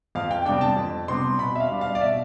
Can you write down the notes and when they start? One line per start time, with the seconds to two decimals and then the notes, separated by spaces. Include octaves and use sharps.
0.15 F2 F5
0.31 G5
0.46 C3 G3 B3 D4 G5
0.61 A5
0.77 F2
1.08 C3 G3 B3 D4 C6
1.39 B2 B5
1.56 E5
1.60 F5
1.71 G3 D4
1.81 F5
1.95 D5
2.01 B2 E5